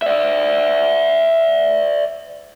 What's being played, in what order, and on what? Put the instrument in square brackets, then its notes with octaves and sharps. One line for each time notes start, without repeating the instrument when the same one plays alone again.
[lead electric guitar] D5 E5